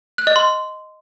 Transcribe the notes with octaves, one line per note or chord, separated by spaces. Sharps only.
F#6
D#5
C6